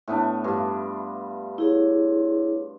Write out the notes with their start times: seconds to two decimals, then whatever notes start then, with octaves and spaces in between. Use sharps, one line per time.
0.08 A2 B3 D4 E5
0.44 G2 F4
1.58 E4 G#4 C#5